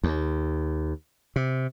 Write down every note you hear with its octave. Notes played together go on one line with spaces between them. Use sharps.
D#2
C3